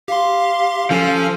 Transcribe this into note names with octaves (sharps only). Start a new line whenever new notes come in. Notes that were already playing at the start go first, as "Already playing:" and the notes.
G4 F5 C6
F3 C#4 A4 G#5